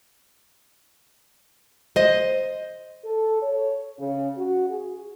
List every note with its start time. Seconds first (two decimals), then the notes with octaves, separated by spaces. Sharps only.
1.96 C5 D#5
3.05 A4
3.43 C#5
3.99 C#3
4.38 F#4
4.70 G#4